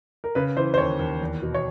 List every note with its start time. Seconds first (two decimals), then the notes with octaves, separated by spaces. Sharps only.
0.24 A#4
0.35 C#3 B4
0.57 E3 C5
0.74 C5
0.78 D#2 C#5
0.99 D#2
1.21 E2
1.42 B2
1.54 C#5